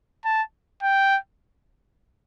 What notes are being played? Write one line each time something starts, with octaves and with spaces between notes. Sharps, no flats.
A5
G5